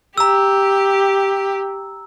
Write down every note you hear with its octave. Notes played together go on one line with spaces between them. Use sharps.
G4 A#5 E6